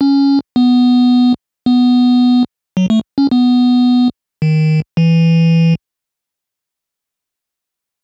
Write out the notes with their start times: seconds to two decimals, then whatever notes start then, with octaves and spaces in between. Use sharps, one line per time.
0.01 C#4
0.56 B3
1.66 B3
2.77 F#3
2.90 A3
3.18 C#4
3.31 B3
4.42 D#3
4.97 E3